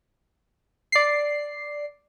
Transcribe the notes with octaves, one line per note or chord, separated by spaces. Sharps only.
D5 C7